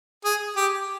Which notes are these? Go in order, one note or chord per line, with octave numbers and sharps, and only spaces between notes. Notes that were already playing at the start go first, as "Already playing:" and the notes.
G#4
G4